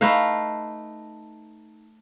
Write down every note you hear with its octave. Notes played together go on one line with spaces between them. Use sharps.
A3 D#4 B4 F5